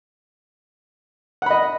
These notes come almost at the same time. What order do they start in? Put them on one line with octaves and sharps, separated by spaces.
F#5 B5 D#5